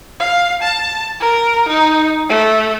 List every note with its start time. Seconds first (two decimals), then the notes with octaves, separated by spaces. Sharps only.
0.20 F5
0.62 A5
1.20 A#4
1.68 D#4
2.29 A3